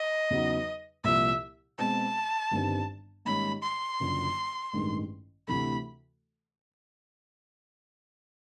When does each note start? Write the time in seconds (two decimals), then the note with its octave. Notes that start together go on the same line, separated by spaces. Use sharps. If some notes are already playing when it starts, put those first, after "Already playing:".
Already playing: D#5
0.30 E2 C#3 F#3 B3 D#4
1.04 C2 A#2 F3 E5
1.79 B2 G#3 C4 A5
2.51 G1 G2 D#3 G3 C4
3.25 G#2 D#3 G3 A#3 C#4 B5
3.63 C6
4.00 F#1 F#2 D3 F3
4.73 A1 G2 D#3 G#3
5.48 D2 C3 E3 A3 B5